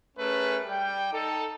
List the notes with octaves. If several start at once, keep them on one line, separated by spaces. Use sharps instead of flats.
A3 C#4 G#4 A#4 B4
G3 G5
D#4 A4